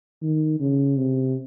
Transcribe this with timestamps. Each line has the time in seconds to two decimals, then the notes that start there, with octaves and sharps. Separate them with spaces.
0.23 D#3
0.60 C#3
0.97 C3